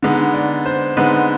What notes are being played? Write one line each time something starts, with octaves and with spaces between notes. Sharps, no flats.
D3 G#3 B3 D#4
D5
C5
D3 G#3 B3 D#4 B4